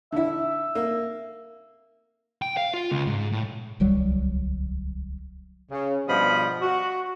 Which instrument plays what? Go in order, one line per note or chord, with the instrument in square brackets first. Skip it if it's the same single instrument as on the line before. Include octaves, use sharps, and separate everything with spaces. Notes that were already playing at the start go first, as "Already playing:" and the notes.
[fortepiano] D3 E4 [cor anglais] E5
[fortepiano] A#3
[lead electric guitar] G5
F5
F4
C#2
G#2
A2
[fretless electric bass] D1 C2 F#3 G3
[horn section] C#3
G2 B2 F3 D#5 B5
F#4